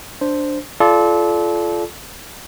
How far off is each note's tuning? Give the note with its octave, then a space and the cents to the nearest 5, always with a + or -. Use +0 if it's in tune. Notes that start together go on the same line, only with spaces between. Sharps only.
D4 +0 C5 +0
F4 -20 A4 -30 D5 +0